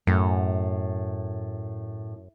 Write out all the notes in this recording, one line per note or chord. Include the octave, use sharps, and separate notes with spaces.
F#2 A2